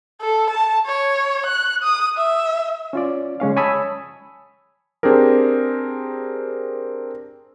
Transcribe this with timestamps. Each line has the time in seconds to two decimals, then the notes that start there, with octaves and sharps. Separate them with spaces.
0.21 A4
0.50 A5
0.86 C#5
1.46 F#6
1.83 D#6
2.17 E5
2.93 C#4 F4 D5
3.40 C#3 G#3 C#4 F5
3.56 C#5 G#5 A5 B5 D#6 E6
5.03 C4 D4 G4 G#4 A#4